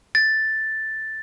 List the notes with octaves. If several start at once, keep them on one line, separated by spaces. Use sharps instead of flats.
A6